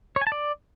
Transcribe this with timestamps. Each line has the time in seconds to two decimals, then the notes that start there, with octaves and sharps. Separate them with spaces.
0.16 C#5
0.21 G#5
0.27 A5
0.32 D5